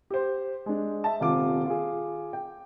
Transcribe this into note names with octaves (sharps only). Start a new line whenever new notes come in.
G4 C5
G#3 D4
E5 A5
D#1 C3 F4 D6
F4 G#4
G5